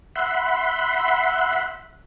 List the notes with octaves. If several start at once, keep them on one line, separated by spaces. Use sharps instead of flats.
E5 F#5 B5 C6